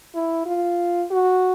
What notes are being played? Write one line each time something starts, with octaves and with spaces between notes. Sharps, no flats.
E4
F4
F#4